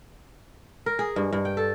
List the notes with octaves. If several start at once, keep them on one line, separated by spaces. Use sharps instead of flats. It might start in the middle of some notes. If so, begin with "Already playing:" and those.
A#4
G#4
G2
G2
G5
A4